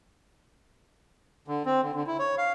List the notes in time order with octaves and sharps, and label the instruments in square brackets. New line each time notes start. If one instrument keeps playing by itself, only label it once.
[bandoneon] D3
C4
D3
D3
E4
C#5
F5